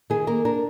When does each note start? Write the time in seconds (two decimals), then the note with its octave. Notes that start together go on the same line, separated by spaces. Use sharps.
0.10 D#3 G#4
0.27 A#3 A#4
0.45 D4 A#4